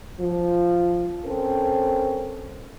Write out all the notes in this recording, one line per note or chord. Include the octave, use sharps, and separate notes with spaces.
F3
C4 C#4 A4 A#4 C5